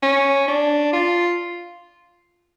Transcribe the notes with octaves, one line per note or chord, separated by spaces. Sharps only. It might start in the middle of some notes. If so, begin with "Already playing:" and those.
C#4
D4
F4